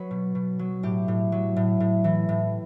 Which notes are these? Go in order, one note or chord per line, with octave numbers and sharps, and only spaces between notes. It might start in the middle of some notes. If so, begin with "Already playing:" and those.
Already playing: F#3 B4 C#5
B2
B2
F#3
A2 G4
A2
F#3
A2
A2
E3
A2